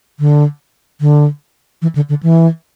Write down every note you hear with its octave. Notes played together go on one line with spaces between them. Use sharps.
D3
D3
E3
D3
D3
E3